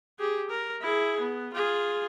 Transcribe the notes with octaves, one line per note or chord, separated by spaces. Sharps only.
G4 G#4
A#4
E4 G#4
B3
F4 G#4